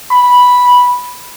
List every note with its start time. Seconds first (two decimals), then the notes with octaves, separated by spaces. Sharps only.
0.11 B5